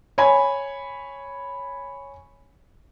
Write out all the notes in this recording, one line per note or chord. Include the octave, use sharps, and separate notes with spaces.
C#5 G#5 B5